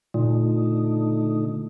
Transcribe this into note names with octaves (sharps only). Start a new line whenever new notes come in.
A#2 D3 A3 D#4